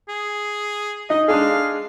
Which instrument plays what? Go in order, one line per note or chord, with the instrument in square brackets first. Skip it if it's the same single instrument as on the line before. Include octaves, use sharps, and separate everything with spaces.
[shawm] G#4
[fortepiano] D#4 [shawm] D#5
[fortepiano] G#3 D4 G#4 [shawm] F5